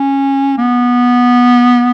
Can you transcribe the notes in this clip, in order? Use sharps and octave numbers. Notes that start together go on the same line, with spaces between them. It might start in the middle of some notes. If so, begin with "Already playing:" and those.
Already playing: C#4
B3